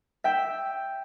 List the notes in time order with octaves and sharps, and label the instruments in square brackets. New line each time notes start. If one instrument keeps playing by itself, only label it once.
[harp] E5 G5